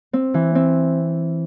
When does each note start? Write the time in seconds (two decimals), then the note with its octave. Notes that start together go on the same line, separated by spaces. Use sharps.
0.13 C4
0.34 E3
0.55 C4